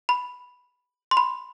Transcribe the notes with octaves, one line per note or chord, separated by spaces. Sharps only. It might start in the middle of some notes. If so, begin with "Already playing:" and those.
B5
C6
B5